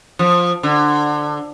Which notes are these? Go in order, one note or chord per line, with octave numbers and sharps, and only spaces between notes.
F3
D3